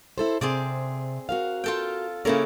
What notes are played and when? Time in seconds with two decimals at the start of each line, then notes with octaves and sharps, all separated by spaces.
0.18 E4 A4 C5
0.41 C3 C4 G#4 D5
1.29 F#4 A#4 F5
1.64 F4 A4 G5
2.25 C#3 A#3 C#4 E4 A4 A#4